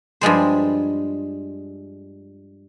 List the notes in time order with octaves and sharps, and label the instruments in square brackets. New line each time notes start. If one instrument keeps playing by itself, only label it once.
[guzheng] G2 F3 G#3 C5